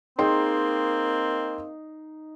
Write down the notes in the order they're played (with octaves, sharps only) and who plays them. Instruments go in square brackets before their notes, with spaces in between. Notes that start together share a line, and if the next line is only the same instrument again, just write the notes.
[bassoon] A#3 [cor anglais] C4 [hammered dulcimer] D#4 [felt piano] G#4 G5 C6